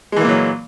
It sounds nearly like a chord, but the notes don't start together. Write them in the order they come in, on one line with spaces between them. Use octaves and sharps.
G#3 E3 A#3 A#2 F#3